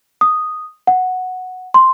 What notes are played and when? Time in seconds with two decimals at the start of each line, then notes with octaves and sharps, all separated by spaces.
0.21 D#6
0.87 F#5
1.74 C6